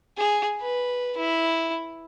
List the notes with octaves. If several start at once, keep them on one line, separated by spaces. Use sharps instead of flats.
G#4
B4
E4